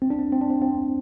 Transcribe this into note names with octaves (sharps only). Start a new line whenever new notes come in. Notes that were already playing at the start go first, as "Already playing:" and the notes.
C4
D4
C4
C4
D4
C4
C4